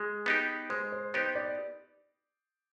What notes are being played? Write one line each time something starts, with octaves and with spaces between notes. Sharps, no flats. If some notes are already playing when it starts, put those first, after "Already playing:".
Already playing: G#3 G#4
B3 D#4 G4
G#3 C5
C5
B3 D#4 G4 C5
D5